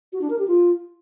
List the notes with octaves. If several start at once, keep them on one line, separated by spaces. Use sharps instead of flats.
F#4
D4
A#4
G4
F4